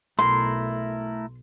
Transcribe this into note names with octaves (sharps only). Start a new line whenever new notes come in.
B1 A3 E4 A#4 C6